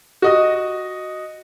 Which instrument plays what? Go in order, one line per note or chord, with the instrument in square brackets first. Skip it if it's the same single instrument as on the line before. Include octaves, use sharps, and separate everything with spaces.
[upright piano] F#4 D#5 D#6